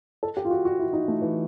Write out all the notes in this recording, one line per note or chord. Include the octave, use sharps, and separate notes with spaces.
A4
G4
F4
F#4
F#4
E4
D#4
A3
E3